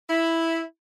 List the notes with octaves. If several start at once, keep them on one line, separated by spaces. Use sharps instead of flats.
E4